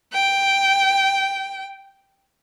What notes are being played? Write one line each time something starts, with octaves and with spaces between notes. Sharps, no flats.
G5